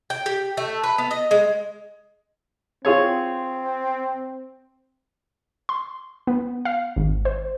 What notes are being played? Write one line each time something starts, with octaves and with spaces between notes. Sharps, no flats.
G5
G4
A3
B4
B3
D#5
G#3
C4 F4 G#4 C#5
C6
B3
F5
G#1
C5